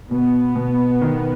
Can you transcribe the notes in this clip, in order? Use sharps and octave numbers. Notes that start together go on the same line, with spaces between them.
B2 B3
B2
D#3